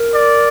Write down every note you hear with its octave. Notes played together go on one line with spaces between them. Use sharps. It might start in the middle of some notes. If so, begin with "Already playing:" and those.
Already playing: A#4
D5